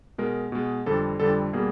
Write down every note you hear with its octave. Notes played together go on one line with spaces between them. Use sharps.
B2 G#3 A#4
B2 G#3
F2 D3 G3 A4
F2 D3 G3 A4
B2 G3 A#3 G#4